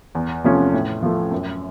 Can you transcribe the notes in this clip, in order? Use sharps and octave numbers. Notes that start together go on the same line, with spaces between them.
E2
C3 F3 A3 C#4
A2
F3 A3
F#2